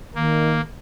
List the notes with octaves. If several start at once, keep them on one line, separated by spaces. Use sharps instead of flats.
D#3 A#3